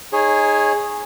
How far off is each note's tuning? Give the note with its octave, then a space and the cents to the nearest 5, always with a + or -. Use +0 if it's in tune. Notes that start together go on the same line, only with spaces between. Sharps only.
D#4 +0 G#4 +0 C#5 -20